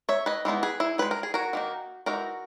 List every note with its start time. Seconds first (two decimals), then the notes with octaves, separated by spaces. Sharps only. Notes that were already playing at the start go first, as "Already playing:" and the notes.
0.09 C#5 E5
0.26 B4 D#5
0.45 E3 G#3 B3 D#4
0.63 G#4 B4
0.80 E4 G#4
0.98 G#3 D#4 B4
1.11 A#4
1.23 G#4
1.34 F#4 A#4
1.53 D#3 A#3 D#4
2.06 E3 G#3 D#4 F#4 A#4